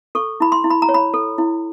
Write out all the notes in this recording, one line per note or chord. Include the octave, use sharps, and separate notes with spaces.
A4 C#6
E4 B5
C6
E4
B5
A#5
C#5
B5
A4
E4